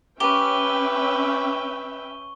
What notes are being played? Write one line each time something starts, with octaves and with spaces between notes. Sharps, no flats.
C#4 G4 B4 E5 G5 C#6 G7